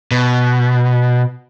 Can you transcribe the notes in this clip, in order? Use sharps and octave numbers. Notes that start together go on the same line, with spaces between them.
B2